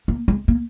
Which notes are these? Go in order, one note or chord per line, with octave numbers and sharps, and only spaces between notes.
A#3
G#3
A#3